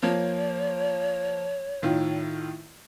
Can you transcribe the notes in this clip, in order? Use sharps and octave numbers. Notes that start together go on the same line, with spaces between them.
F3 A#3 C#5
A2 D#3 F4